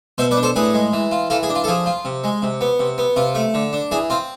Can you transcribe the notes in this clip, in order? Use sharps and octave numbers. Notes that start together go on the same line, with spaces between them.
B2 C5 E5
B4 D5
D4
A4 C5
A2 G#4 B4
G#3
E3
F4
E3 F4 A4
G#4
D4
F4
A4
F3 G#4
F4
C3
G#3
C3
B3
C3
B3
C3 F4
A3
D3
D4
E3 G#4
C4 F4